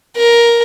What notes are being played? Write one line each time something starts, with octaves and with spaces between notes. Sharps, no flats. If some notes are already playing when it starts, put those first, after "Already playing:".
A#4